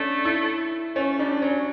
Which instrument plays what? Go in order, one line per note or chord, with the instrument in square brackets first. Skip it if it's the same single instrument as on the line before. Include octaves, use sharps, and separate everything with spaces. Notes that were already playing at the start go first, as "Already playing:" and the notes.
Already playing: [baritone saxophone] A3 [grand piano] C#4 D4
[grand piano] E4
[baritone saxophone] A3 [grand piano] C#4
[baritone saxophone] G3 [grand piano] D4
[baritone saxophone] F#3 [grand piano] C#4